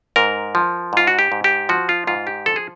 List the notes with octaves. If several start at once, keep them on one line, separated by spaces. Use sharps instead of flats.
G#2 A#4
F3
G#2 F4
F#4
G4
G#2
G4
F3 F#4
F4
G#2 F4
G4
F3 A4
G#4